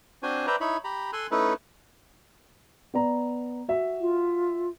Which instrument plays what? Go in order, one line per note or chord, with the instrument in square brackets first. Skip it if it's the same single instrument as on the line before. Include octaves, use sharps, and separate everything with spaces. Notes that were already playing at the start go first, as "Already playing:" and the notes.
[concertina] C4 D4 F#4 C5 G#5
B4 C5 D5 E5 G5 A#5
D#4 E4 C#5 B5
G4 A#5 B5
A4 G#5 C6 E6 F#6
A3 C#4 D#4 E4 A4 B4
[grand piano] B3 D5 A#5
F#4 E5
[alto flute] F4